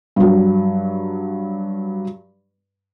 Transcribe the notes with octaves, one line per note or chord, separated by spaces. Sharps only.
G2 F#3